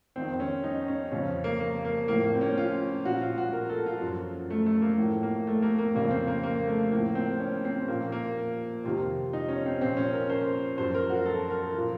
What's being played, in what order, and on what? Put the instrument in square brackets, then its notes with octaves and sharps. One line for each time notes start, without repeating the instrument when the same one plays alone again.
[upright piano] F2 D#3 C4
C4
C#4
D#4
C#4
F2 C#3 F3 C#4
A#3
A#3
A#3
A2 F3 A#3
A#3
C4
C#4
F4
A#2 F3 F#4
F4
F#4
A#4
A4
F4
F#2 F3
A3
A3
A#3
A2 F3
A#3
A3
A#3
A#3
F2 C#3 F3 A#3
C4
A#3
A#3
A3
A2 F3 A#3
C4
C#4
C4
A#2 F3 A#3
A#3
F2 C3 D#3 F4
D#4
C#4
C4
A#2 F3 C4
C#4
A#4
C5
F#2 F3 C5
A#4
F#4
A4
A#4
A#2 F3